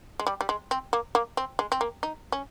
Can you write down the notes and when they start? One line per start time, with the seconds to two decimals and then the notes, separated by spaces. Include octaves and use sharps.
0.19 G#3
0.27 G3
0.41 G3
0.49 G#3
0.71 C4
0.93 A#3
1.15 A#3
1.37 C4
1.59 G#3
1.72 C4
1.81 A#3
2.03 D#4
2.32 C#4